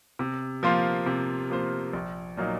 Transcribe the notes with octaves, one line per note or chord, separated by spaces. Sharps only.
C3
F3 A#3 F4 C5
C3
F3 A#3 F4 C5
A#1
A#2 F#3 A#3 D#4